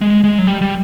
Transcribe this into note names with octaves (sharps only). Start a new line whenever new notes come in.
G#3
G#3
F#3
G3
G3